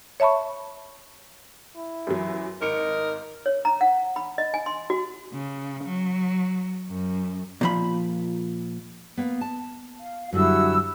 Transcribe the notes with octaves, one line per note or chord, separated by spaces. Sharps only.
C#5 E5 A5 B5 C#6
E4
F#2 E3 F#3
G#1 A#4 D#5 C#7 D7
C#5
A#5
F#5
B5
D#5
G#5
C6
F#4
C#3
F#3
F#2
A#2 F3 B5
A#3 B3
A5
F5
F#2 D3 G3 E4 F#4 E6